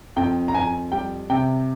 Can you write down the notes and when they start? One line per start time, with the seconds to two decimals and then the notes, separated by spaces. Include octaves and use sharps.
0.16 F2 G5
0.48 A#5
0.54 F2 G#5
0.92 G3 G5
1.30 C3 G5